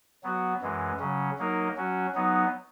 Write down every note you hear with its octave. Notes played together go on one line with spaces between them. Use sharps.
F#3 B3 F#4
F#2 E3 G#3
C#3 F#3 C#4
F#3 A#3 D#4 A#4
F#3 C#4 F#4
F#3 B3 D#4